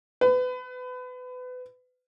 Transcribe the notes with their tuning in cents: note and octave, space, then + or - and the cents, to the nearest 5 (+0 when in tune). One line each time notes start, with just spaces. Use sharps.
B4 +30